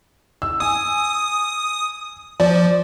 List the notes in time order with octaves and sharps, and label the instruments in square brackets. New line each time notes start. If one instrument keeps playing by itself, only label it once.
[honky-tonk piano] E6
[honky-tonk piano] G#5 [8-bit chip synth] D#6
[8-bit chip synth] F3 [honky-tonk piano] D5